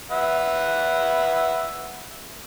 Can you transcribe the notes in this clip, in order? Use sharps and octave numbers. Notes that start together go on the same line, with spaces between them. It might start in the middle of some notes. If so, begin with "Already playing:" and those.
B4 E5 F#5